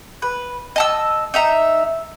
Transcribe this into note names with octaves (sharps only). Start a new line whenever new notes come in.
B4
D#5 A5 E6
D#4 E5 A#5